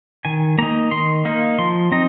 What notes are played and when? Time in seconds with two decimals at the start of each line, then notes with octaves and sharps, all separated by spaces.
0.25 D#3 G#5
0.58 A#3 D#4 A#5
0.91 D#3 C6
1.25 A#3 D#4
1.59 F3 C6
1.92 C4 D#4 A#5